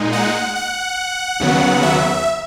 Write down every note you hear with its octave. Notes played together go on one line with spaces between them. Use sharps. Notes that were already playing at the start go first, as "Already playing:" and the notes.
Already playing: A#2 G#3 D#4
F#5
F#5
D#2 C#3 F#3 B3
E5